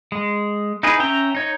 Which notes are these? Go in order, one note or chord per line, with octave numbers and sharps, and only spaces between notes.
G#3
D#4 E4 G#4 B4
C#4 E5 G5 A#5
D#4 C#5